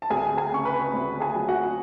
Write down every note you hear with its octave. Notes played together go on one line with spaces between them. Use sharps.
A5
D2 G#4 G#5
G#4 G#5
C#3 C#6
B4 B5
D2
G#4 G#5
F#3
F#4 F#5